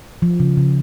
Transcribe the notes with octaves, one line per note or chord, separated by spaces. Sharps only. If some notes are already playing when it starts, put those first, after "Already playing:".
F3
C#3
C#3